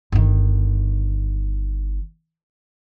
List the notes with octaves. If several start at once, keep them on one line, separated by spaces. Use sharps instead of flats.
G1 D#3